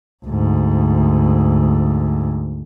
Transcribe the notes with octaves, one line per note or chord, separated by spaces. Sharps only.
D2 G#2